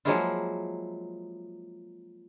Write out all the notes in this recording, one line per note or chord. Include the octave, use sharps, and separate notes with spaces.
F3 F#3 G#3 A#3 E4 F4